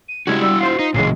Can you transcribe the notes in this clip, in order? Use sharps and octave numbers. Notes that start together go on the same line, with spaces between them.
D#7
C#3 G3 G#3 E4 F#4 G#6
G3 E6
F4 C5 C7
D#4
A1 A#2 C#3 E3 F#3 G#3 C7